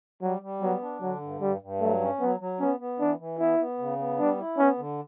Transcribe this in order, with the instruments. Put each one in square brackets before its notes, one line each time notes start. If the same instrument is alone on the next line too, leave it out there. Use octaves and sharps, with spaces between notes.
[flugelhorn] F#3 [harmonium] G3
[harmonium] G3
[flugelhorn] F#3 [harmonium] B3
[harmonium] D4
[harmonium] D3 [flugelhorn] F#3
[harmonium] G2
[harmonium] G2 [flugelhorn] G3
[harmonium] G2
[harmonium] F#3 [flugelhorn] A3
[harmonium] C#4
[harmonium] F#3 [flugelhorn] B3
[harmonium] F#3
[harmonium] B3 [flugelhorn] C#4
[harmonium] B3
[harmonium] E3 [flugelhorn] D4
[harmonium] E3
[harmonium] B3 [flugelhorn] E4
[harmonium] B3
C#3
B3
[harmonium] G3 [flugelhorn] D4
[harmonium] E4
[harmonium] B3 [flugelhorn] C#4
[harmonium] D3